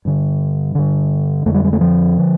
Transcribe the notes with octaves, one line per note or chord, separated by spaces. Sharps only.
G2 D3
G2 D3
F2 D3 A3
G3
G3
A3
F3
D3